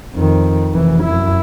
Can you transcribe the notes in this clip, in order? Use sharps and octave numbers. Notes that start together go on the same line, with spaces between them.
F2 D#3
F1 E3
F#2 E4